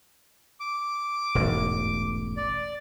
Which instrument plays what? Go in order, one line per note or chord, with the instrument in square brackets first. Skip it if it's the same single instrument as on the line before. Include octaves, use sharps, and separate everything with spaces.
[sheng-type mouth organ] D6
[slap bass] E1 A1 G#2
[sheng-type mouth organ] D5